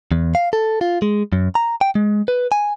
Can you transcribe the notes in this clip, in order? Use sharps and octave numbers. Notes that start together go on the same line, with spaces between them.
E2
F5
A4
F4
G#3
F#2
A#5
G5
G#3
B4
G#5